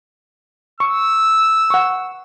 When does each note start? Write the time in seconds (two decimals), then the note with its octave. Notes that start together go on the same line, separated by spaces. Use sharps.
0.80 C#6 E6
1.70 F#5 C#6